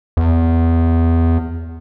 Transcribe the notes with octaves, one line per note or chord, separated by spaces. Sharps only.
E2